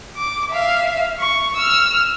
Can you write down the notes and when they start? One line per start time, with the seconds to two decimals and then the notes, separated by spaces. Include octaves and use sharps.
0.17 D6
0.51 E5 F5
1.19 C#6
1.56 E6 F6